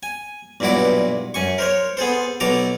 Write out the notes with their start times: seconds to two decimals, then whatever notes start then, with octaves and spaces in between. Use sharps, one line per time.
0.03 G#5
0.60 B1 G2 A#2 E4 F#4 D6
1.34 F#2 G#5 C#6
1.58 A#4 C5 C#5
1.97 B3 G#4 A4 C5
2.40 B1 B2 A4 A#5 D6